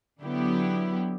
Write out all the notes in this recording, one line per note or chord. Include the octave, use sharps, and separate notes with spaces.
D3 F#3 B3 E4 G4